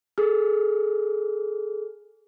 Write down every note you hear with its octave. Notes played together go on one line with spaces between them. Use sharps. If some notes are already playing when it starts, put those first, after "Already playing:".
G#4 A4 F6